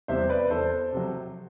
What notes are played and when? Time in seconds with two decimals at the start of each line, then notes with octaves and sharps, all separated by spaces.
0.08 E2 C3 G3 C5 E5
0.29 B4 D5
0.50 E2 A4 C5
0.93 C3 F#3